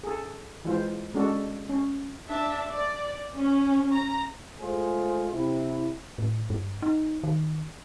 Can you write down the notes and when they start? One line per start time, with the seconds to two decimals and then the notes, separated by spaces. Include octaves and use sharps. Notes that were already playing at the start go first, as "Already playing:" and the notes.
0.04 G#4 A4
0.65 E3 G#3 F4 C5
1.14 G#3 C#4 D4 F#4 A4
1.69 C#4
2.28 D4 E5 A5
2.72 D5
3.36 C#4
3.92 A#5
4.61 G#3 A3 F4 G#4 C5
5.33 C3 E4
6.18 A2
6.50 G2
6.82 D#4
7.24 D#3